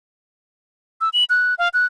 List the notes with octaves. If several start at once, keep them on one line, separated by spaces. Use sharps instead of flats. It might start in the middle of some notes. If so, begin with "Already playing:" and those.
E6
F#7
F#6
F5
F#6